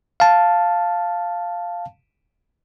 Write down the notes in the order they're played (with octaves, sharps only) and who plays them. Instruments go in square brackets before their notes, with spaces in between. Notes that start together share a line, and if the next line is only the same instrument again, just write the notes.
[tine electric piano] F5 A5